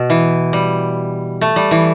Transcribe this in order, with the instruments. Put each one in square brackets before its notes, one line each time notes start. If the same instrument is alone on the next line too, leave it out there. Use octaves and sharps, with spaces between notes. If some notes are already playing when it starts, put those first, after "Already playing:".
Already playing: [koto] B2
E3
G3
A3
G3
E3